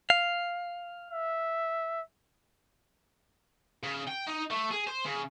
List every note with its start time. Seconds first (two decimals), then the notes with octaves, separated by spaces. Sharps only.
0.10 F5
1.11 E5
3.83 C#3
4.07 G5
4.27 D#4
4.51 A3
4.71 G#4
4.87 C5
5.05 C#3